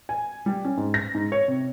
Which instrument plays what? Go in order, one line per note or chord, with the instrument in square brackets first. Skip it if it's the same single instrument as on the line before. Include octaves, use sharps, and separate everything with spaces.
[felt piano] G#5
G3
C#4
G#2
A#6
G#2
C#5
C3